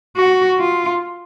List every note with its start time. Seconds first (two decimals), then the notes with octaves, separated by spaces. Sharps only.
0.17 F#4
0.58 F4